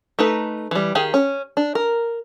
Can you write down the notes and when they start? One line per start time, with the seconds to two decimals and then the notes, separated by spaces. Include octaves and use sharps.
0.19 A3 D#4 B4
0.71 E3 G3
0.95 D#3 G4 G#4 F5
1.14 C#4
1.57 D4
1.75 A#4